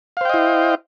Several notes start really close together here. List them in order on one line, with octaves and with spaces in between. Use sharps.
F5 C5 G5 D#5 E4